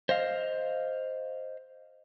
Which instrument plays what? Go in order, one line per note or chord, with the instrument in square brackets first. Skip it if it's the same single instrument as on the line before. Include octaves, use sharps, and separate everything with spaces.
[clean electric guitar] C5 D#5 F5